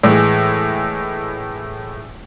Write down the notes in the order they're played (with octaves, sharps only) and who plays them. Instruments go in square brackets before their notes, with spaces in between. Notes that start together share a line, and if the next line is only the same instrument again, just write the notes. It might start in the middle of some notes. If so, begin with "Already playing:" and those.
[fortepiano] A2 E3 G#3